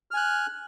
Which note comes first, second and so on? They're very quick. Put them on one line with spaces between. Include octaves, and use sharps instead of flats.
F6 G#5 F#6